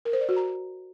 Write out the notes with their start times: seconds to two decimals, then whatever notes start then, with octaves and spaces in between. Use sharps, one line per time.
0.05 A#4
0.13 C5
0.21 D5
0.29 F#4
0.36 A#5